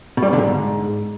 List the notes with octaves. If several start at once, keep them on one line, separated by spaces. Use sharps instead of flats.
B2
G3
B2
D3
G#2